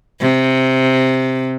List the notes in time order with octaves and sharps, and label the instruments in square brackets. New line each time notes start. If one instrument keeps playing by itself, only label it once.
[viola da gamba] C3